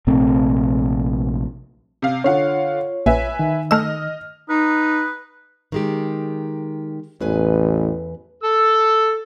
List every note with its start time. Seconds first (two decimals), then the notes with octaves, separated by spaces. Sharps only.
0.07 A#1 C3 A3 C4
2.02 C3 F5
2.24 D3 F4 C#5 F5 F#5
3.06 A#1 B4 E5 G#5
3.39 D#3
3.71 A3 D#5 E6 F6
4.50 D#4 B4
5.72 D#3 G#3 G4
7.20 A1 E2 B4 G#5
8.43 A4 E6